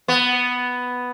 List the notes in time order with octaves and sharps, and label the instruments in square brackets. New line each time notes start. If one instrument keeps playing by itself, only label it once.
[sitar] B3